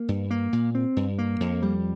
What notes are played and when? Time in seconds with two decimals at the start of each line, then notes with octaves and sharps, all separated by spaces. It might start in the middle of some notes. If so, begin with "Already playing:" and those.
Already playing: A#3
0.08 G2
0.31 A#3
0.53 A#2
0.75 C4
0.96 G2
1.18 A#3
1.40 F2
1.62 G3